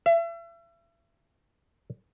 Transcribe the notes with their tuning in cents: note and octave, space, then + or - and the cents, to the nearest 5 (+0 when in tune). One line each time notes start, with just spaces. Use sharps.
E5 +35